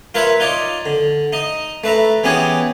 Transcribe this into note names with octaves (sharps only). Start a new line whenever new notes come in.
F4 A#4 B4 C#5 E5 B5
D#4 F4 C#5 D5
D3
D#4 D#5
A3 B4 E5 A#5
E3 B3 C#4 G4 G#4 C#5